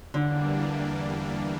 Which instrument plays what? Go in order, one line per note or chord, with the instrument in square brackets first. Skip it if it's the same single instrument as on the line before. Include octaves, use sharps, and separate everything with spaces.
[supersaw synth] E2 E3 G3 A#3 D4 [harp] D3